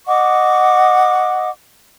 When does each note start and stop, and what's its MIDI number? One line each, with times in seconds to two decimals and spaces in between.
0.07 1.51 75
0.07 1.51 78
0.07 1.51 85
0.07 1.51 86